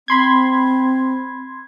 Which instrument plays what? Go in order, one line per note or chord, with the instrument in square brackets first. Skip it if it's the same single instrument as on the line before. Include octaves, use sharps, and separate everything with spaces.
[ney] C4 [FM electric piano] B5 C6 G#6